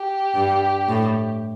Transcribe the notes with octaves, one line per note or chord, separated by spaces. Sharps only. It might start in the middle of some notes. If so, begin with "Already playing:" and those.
Already playing: G4
G2
A2